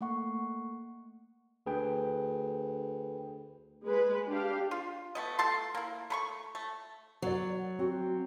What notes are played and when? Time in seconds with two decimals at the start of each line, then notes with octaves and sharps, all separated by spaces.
0.01 A3 A#3 F#5 C#6
1.66 D2 G#4 B4 G5
3.85 G#3 B4
4.27 D4 G4 F5
4.71 F4
5.15 A3 B3 D#5
5.39 A3 E5 A5 C6
5.74 A#3 E4
6.10 A3 B5 C#6
6.55 A3
7.22 F#3 C#5 D5
7.79 C4 F#4